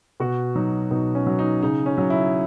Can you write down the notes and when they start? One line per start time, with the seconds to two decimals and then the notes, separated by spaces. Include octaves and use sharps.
0.20 B2 F#4
0.56 F#3 D#4
0.91 B2 D#4
1.15 C#4
1.26 F#3
1.39 D#4
1.63 C#3 D#4
1.86 C#4
1.98 F#3
2.10 E4